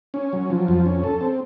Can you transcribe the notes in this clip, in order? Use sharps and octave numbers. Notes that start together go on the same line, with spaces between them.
C#4
F#3
F3
F2
C#4
A4
C4